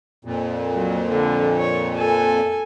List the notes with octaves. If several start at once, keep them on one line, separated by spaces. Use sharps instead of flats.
F2 A#2
F#3
D3
C#5
A4 G#5